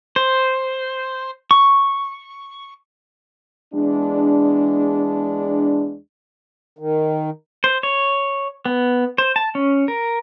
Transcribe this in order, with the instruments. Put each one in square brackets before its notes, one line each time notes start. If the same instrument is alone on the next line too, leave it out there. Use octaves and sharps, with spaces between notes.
[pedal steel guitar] C5
C#6
[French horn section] E2 G#3 D4
[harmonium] D#3
[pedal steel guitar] C5
C#5
B3
C5
A5
C#4
A#4